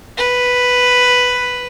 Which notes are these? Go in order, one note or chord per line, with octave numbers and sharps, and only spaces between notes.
B4